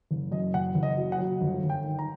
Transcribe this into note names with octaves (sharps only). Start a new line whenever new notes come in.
F#1
F#2 D#5
F#1 F#5
F#1
D#5
F#3
F#5
F#3
G1
G1
G5
D#3
A#5